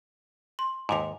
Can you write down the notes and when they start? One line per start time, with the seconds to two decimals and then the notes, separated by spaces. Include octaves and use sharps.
0.59 C6
0.89 D#2 G#2 G#5 D6 F7